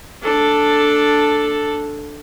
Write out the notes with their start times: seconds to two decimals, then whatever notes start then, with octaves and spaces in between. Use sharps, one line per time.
0.23 D4 A4